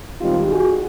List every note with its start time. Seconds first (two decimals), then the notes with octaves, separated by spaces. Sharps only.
0.21 G#2 D#3 G3 C4 D#4 F4 G4
0.49 F#4 G#4